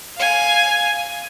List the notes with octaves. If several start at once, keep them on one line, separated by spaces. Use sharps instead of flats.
F5 G#5